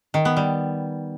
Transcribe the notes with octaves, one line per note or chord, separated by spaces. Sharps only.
D#3
B3
G3